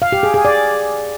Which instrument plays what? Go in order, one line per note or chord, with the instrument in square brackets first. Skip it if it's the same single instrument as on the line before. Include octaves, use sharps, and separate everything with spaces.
[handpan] F5
G4
G#4
G#4
D5